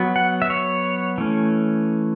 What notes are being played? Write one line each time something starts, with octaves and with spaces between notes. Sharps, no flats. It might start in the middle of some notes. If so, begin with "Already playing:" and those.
Already playing: F#3 B3
F#5
E5
C#5
E3 A3 C#4